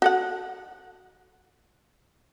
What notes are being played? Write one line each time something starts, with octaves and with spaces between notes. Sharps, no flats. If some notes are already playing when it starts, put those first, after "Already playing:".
F#4 A4 F#5